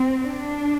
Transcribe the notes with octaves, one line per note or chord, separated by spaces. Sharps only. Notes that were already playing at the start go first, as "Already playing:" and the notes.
Already playing: C4
D4